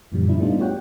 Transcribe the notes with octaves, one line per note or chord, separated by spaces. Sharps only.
F#2 A#2 D3 E3 F3 G3
G#2 B2 D4 E4
G3 A3 B3 D4 D#4 F4
F#4 G4 C#5 F#5 G5